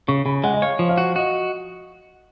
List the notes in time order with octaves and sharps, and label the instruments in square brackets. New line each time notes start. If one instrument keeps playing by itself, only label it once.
[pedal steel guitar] C#3 [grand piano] C#6
[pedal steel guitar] C#3 [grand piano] B5
[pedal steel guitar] G#3 [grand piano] F#5
[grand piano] D#5
[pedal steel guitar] C#5 [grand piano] F5
[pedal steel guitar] F3
[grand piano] F5
[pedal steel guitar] F#4
[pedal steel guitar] F#4 [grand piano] D#5